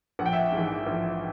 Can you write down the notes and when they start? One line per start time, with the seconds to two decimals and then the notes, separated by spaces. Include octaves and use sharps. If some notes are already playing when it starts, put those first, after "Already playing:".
0.19 A#1 F#5
0.26 G5
0.33 E5 F#5
0.52 G#2
0.57 E3
0.87 A#1